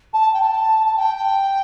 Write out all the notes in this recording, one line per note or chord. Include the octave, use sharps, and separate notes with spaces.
A5
G5
A5
A5
G5